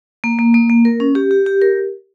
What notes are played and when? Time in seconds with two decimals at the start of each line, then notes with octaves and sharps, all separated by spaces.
0.24 A#3
0.39 A#3
0.54 A#3
0.70 A#3
0.85 A#4
1.00 C#4
1.15 G4
1.31 G4
1.46 G4
1.61 A#4